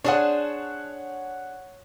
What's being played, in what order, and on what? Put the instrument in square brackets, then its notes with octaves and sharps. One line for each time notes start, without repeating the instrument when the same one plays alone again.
[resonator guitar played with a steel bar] D4 G#4 C5 [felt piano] C#5 F#5